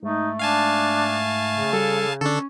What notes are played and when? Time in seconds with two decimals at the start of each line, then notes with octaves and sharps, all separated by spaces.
0.03 G#2 A3 D#4
0.39 D4 F5 G#5 A5
1.52 C#3
1.73 G3 A4
2.21 D3 C#4 D4 A4